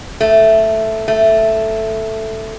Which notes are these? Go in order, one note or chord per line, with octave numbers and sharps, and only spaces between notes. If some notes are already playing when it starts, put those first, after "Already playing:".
A3
A3